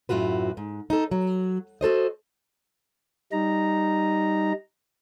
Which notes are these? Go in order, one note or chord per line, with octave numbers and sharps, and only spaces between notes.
F#2 A2 F4 F#4 B4
G#2
D#4 A4
F#3
F#4 A4 C5 D#5
G3 D#4 A#5